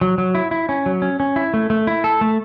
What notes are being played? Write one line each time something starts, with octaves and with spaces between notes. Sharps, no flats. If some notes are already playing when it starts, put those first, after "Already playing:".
F#3
F#3
E4
E4
C#4
F#3
C#4
C#4
E4
A3
A3
E4
A4
A3